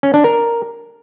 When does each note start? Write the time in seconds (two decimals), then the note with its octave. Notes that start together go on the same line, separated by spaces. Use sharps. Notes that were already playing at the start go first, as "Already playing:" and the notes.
0.03 C#4
0.14 D4
0.24 A#4